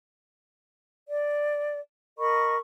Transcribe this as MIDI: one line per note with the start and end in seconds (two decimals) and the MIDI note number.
1.09 1.78 74
2.19 2.57 70
2.19 2.57 75
2.19 2.57 83
2.19 2.57 85